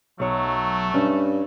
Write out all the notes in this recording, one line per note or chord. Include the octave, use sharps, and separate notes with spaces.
B1 F#3 A3 C#5
G2 C#4